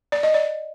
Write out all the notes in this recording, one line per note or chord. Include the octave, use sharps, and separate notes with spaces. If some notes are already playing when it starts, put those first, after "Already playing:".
D5
D#5
D5